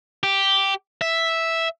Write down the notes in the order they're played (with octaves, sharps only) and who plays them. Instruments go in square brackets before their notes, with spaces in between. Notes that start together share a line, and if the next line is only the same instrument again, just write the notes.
[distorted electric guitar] G4
E5